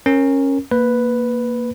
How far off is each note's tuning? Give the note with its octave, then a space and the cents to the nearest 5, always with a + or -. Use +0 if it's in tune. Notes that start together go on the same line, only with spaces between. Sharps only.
C#4 -20 A#4 +0
A#3 +0 B4 +0